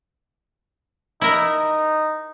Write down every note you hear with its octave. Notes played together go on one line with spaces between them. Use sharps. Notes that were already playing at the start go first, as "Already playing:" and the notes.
D#4 E4 A#4